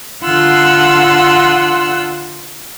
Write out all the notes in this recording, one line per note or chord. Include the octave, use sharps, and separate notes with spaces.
D3 F4 F#5 C6 E6 F#6